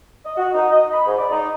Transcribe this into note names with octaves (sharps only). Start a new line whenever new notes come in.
D#5
F#4
D#4
D#5
B5
G#2
D5
D#4